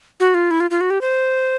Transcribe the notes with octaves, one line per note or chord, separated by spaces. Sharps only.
F#4
F4
E4
F4
F4
F#4
G4
C5